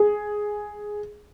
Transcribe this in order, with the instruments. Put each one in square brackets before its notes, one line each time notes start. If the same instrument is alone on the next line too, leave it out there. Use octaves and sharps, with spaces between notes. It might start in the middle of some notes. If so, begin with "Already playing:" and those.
Already playing: [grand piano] G#4